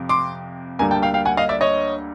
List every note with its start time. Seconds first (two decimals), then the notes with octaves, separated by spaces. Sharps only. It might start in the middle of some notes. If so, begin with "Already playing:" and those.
Already playing: F2 C3 F3
0.09 C6 D6
0.79 D2 D3 G3 A#3 G#5 A#5
0.91 G5 A5
1.02 F5 G5
1.14 F5 G5
1.25 F#5 G#5
1.37 D#5 F5
1.49 D5 E5
1.61 C#5 D#5